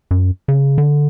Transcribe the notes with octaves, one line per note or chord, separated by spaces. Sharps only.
F#2
C#3
D3